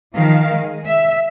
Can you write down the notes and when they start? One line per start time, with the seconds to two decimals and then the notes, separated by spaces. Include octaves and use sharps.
0.15 D#3 F3 F5
0.52 G#3
0.85 E5